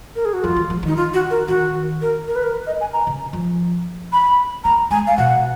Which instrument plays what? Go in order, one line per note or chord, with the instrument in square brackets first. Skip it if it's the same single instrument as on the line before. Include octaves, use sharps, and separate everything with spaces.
[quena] A#4
G#4
F#4
[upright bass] F2 [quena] F4
[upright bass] D#3
F3
[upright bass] D#3 [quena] D#4
[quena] F4
F#4
A#4
[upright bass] D#3 [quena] F#4
[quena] A#4
A#4
B4
A#4
D#5
G#5
A#5
[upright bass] C#3
F3
[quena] B5
[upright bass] A#3 [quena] A#5
[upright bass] G#3 [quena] G#5
[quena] F5
[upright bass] B2 [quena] F#5